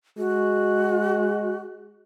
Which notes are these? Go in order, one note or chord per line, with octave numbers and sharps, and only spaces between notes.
G#3 F#4